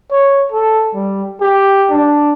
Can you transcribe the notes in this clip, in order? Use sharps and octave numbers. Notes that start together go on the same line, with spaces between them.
C#5
A4
G3
G4
D4